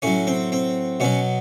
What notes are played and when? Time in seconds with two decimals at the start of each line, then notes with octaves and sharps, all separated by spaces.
0.02 A2 F#3 C#4
0.27 C4
0.52 C4
1.00 B2 F#3 C#4